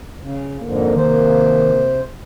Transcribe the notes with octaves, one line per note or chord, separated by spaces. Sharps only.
C#3
F2 G#2 D3 A#3
C3 D#3 C5